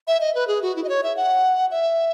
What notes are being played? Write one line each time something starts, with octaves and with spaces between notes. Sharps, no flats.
E5
D#5
B4
G#4
F#4
E4
D#5
C#5
E5
F#5
E5